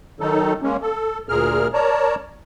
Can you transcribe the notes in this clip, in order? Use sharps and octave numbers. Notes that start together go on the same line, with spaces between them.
D#3 F#3 D#4 A4
G#3 A#3 C#4
A4
D2 A#2 G#4 A#4 F6
A#4 C#5 D5 A5 A#5